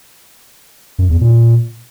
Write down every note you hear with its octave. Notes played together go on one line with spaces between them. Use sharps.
F#2
E2
A#2